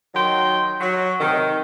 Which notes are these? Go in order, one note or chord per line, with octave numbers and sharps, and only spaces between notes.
D#3 F#3 D#5 G5 C6
F#3
C3 D#3